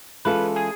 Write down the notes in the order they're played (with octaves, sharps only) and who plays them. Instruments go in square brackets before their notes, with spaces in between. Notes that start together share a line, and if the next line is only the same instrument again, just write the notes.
[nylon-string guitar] E3 G#3 C#4 F4 A4 [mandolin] B4
[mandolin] G#4